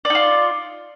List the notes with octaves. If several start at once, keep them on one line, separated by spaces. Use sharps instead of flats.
D#4 F4 D5